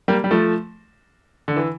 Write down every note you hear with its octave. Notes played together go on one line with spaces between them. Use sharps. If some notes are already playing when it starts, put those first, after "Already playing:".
G3 A#3
G3
F3 A3
D3
E3